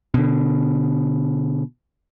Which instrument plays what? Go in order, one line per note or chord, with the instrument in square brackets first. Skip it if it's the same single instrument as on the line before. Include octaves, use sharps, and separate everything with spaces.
[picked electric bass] B2 D3